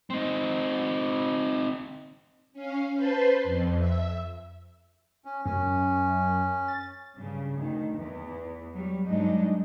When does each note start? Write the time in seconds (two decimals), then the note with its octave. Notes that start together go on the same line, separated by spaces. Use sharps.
0.10 C4 D#4
2.53 C#4 F5
2.94 B4 C5 A5 C6
3.44 F2
3.77 E5
5.25 C#4
5.45 F#2 C#4
6.68 A6
7.18 G2 C#3
7.55 D2 D#3
7.94 E2
8.73 F#3 G3
9.06 G2 F#3 G#3 D4 D#4